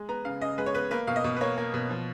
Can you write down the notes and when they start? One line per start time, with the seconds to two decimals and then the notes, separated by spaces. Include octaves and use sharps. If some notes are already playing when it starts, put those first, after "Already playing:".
Already playing: G#3
0.09 B3 A#5
0.25 C#3 F5
0.42 C#3 D#5
0.58 G#3 B4
0.66 C#5
0.74 B3 B4
0.91 A#3 B4
1.07 B2 F5
1.16 D#5
1.24 B2
1.36 B4
1.41 A#3 C#5
1.58 A#3
1.74 B2
1.90 F3